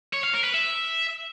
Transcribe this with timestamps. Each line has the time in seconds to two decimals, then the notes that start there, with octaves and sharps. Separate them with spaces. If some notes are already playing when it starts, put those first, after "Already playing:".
0.13 C#5
0.23 F5
0.34 A#4
0.44 B4
0.54 E5